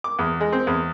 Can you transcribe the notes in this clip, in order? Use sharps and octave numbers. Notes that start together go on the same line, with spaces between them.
D6
E2
G#3
C4
E2